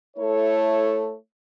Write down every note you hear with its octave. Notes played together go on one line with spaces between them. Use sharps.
A3 E4 A4 C#5